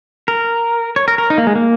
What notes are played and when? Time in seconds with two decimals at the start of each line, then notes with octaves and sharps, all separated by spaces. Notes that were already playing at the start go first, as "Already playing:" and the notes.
0.28 A#4
0.96 C#5
1.08 A#4
1.18 A#4
1.30 D#4
1.38 A#3
1.47 G#3
1.55 A#3